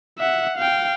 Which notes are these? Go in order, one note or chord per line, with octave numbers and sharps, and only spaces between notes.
E5 F#5
F5 G5